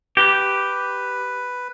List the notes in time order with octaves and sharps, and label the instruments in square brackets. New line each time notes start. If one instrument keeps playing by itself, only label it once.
[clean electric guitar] G4 [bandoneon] B4